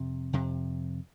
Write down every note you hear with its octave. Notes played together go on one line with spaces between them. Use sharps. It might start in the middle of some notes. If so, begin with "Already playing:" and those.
Already playing: F2 C3
F2 C3